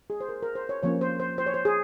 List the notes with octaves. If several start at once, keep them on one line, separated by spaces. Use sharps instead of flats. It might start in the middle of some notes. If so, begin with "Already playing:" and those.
G#4
C5
A#4
A#4
C5
C#5
F3 A#3 C#4 C#5
C5
C5
C5
C#5
C5
G#4